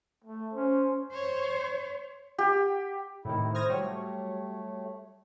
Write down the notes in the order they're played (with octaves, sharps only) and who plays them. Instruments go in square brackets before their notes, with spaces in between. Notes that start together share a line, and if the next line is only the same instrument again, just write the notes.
[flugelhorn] A3
[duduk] C#4 [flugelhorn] C5
[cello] C5 C#5
[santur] G4
[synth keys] A2 C3 D#3 [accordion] E4
[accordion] C5 D#6 [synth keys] F6 G#6 A#6
[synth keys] F#3 G3 C#5 [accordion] A3